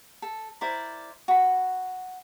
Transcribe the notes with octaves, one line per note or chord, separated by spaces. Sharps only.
A4
E4 A#4 C5 D5
F#4 B5